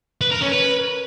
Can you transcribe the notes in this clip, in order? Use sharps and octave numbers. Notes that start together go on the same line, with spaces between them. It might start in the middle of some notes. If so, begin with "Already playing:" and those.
B4
A#4
C#4
B4